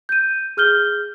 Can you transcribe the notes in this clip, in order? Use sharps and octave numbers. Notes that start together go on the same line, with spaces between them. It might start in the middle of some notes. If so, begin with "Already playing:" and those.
G6 D#7
G#4 F6 G6 G7